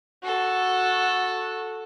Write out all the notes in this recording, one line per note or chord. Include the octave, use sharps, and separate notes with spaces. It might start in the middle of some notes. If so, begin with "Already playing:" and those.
F#4 A4